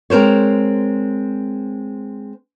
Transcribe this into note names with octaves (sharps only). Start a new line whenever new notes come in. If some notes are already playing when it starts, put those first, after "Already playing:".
G#3 C4 A#4 C5 C#5